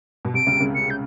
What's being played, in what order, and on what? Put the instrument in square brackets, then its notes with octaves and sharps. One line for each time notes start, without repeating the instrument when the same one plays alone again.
[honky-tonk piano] B2
[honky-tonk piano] C3 [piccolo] D7
[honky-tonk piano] C#2 C#3
C#2 C#3
[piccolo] C#7
G6